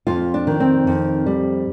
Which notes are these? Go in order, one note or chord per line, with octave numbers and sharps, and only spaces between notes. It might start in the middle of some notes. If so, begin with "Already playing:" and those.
F2 F4
D4
D#3
C4
F2
G3